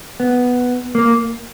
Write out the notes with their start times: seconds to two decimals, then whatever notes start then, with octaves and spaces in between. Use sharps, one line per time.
0.20 B3
0.95 A#3